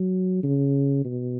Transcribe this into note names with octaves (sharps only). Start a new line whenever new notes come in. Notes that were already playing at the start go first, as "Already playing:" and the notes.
Already playing: F#3
C#3
B2